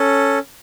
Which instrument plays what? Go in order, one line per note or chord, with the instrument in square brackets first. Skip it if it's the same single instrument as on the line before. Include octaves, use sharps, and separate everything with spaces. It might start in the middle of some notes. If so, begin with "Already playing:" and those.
Already playing: [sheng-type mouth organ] C#4 A4